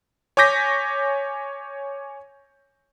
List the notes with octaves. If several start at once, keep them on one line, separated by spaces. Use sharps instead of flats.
C#5 G#5 D6 G6 A#6 B6